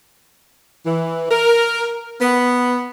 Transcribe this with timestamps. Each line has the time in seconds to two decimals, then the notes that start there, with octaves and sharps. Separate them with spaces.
0.84 E3
1.29 A#4
2.20 B3